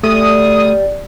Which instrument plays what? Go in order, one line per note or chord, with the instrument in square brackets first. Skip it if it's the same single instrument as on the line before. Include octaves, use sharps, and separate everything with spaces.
[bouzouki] G3 [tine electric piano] A3 [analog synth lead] D#6